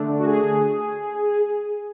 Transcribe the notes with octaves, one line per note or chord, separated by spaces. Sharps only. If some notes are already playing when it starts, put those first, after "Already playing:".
Already playing: D3 A3 D4
F#4
G#4